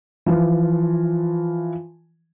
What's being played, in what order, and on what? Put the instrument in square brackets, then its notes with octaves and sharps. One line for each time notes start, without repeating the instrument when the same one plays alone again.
[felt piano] E3 F3 F4